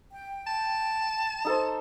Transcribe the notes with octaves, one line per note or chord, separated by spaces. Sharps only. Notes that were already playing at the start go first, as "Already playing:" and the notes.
G5
A5
D#4 A4 C5